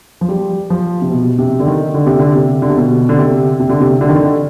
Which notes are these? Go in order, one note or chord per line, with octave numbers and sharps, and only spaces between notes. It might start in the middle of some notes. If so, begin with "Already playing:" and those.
F3
G3
F3
C3
B2
C3
D3
D#3
D3
C3
D3
C3
D3
C3
B2
D3
C3
C3
D3
C3
D3
D#3
D3